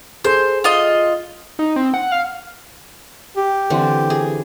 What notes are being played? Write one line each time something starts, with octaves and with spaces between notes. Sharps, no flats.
G#4 A4 C5
F4 D#5
D#4
C4
F#5
F5
G4
D3 E3 C4
G#4